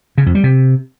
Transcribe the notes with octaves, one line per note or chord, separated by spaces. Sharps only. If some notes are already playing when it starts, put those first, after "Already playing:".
C#3
F2
G3
C3